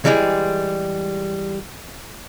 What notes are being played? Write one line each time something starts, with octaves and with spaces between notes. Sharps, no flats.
E3 G3 G#3 G4 G#4